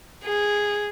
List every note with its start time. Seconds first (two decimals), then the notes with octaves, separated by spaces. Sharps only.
0.24 G#4